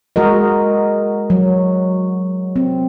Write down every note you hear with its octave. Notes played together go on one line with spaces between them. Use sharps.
G#3 F#4 A#4 D#5
F#3
C4